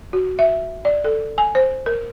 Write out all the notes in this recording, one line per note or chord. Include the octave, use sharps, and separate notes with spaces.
F#4
E5
D5
A4
G#5
C5
A#4